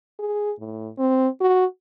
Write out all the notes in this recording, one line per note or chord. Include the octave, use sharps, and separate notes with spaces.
G#4
A2
C4
F#4